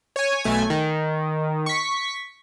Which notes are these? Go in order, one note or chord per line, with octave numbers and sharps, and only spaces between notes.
C#5 G#5
B1 A3 G#5
D#3
C#6 B6